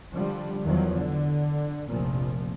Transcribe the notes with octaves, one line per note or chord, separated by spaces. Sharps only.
D3 F3 G3
E2 D#3 F3 F#3
D3
F1 A#1 A#2 F3